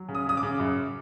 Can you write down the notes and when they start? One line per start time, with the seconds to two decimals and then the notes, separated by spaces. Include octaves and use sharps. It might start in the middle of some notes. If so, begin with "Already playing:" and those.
Already playing: F#3
0.09 C#3
0.15 D#6
0.26 C#3 D#6
0.37 D6
0.43 C#3
0.60 F#2